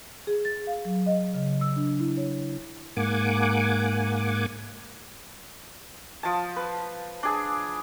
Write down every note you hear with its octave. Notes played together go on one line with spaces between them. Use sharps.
G#4
A6
F5
F#3
D#5
C#3
E6
D4
E4
C#5
G#2 A#3 F#5 G#5 D6
F3 A5
B4
D4 G#4